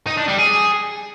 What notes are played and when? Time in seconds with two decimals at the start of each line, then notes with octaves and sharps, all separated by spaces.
0.07 D#4
0.17 D4
0.28 G3
0.38 G#4